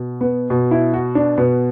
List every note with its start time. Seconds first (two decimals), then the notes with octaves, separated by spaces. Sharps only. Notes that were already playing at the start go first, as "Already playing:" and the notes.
Already playing: B2
0.21 B3
0.50 B2
0.71 E4
0.94 F#4
1.15 D4
1.38 B2 B3